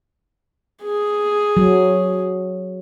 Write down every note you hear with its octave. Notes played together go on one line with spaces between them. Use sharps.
G#4
F#3